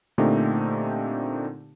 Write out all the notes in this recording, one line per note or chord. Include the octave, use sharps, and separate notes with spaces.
A#2 D3 A3 C4 D#4 G4